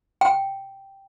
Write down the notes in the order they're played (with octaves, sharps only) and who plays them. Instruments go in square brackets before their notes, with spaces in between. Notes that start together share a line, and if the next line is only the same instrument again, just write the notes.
[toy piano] G5